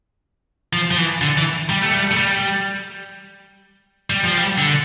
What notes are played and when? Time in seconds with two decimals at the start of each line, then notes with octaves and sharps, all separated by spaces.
0.73 F3
0.91 F3
0.98 E3
1.21 D3
1.37 E3
1.69 G3
1.81 A3
1.93 G3
2.11 A3
2.17 G3
4.10 G3
4.24 F3
4.37 G3
4.58 D3